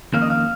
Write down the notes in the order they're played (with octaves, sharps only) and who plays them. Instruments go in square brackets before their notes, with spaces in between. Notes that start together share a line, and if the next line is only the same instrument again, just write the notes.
[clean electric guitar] F2 D#3 A#3 C#4 F5
D#5
F5